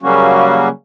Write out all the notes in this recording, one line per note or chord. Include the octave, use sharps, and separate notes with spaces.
C#3 F#3 G3 A#3 C#4 F#4